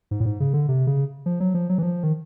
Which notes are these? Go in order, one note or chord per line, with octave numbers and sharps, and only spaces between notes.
G#2
A2
G#2
C#3
D3
C3
C#3
F3
F#3
F3
F#3
E3
F3
D#3